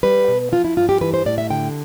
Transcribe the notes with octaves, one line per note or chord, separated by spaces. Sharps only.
G3 B4
B2
F3 F4
E4
G2 F4
G4
E3 B4
C5
A2 D5
E5
D3 G5